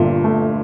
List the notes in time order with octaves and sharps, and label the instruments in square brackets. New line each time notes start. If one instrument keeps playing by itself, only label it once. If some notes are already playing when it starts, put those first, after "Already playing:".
Already playing: [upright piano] G1 G2 [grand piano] A#2
[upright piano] A3